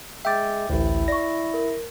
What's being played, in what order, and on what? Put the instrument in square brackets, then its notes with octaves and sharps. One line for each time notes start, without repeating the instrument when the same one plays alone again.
[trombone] G#3 [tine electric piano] E5 D6 [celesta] G5 G6 A6
[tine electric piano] A1 D2 [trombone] E4
[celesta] D5 C#6 [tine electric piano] A#6
[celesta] A#4